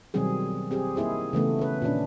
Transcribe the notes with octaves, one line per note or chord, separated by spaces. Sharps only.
B2 D#3 F#3 G3 C4 G#4
C4 G4 G#4
A#3 D#4 E4 G#4 C5
C#3 E3 A3 B3
C#4 B4
A#2 D#3 C#4 D4